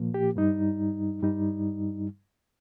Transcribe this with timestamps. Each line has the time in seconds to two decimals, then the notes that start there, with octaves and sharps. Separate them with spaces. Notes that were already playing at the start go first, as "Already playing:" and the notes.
Already playing: A#2 F3 A#3
0.14 G4
0.36 G2 G3 D#4
1.22 G2 G3 D#4